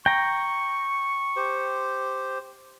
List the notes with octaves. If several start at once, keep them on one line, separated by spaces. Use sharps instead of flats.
G5 A#5 C#6
G4 C5